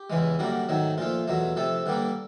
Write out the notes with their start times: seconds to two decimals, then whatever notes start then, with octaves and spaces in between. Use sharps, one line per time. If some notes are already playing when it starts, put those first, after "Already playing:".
Already playing: G4
0.10 E2 C#3 E3 G#3
0.39 F#2 D3 G3 A#3 F#4
0.69 G#2 D#3 F#3 A3
0.98 A#2 F3 A3 F4
1.28 E2 B2 F#3 A3
1.56 C3 F3 A3 A4
1.86 G2 D3 G3 A#3